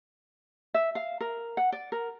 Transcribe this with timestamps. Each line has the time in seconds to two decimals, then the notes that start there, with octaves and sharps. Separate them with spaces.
0.74 E5
0.95 F5
1.20 A#4
1.57 F#5
1.72 D5
1.92 A#4